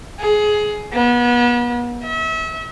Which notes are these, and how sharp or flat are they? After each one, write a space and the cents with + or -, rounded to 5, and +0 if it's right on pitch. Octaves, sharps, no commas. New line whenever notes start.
G#4 +15
B3 -35
E5 -35